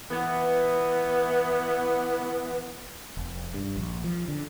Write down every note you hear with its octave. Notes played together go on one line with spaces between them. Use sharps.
E3 B3
F1
G2
A#1
F3
D3